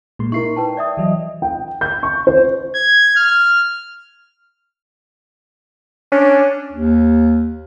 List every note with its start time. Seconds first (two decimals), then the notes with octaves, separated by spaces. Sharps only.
0.19 A#2 G#3 C6
0.32 D#4 E4 A#4 C#6 C7
0.56 B4 G5 A5
0.77 D5 E5 G5 D#6
0.97 E3 F#3 D#5
1.42 G5
1.81 G6
2.03 C#6
2.27 C5
2.75 G#6
3.16 F6
6.12 C#4 D4
6.72 D#2